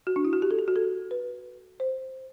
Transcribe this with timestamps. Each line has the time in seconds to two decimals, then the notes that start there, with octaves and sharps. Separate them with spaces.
0.07 F#4
0.16 D4
0.25 E4
0.33 F#4
0.42 G4
0.51 A4
0.59 G4
0.68 F#4
0.76 A4
1.11 B4
1.80 C5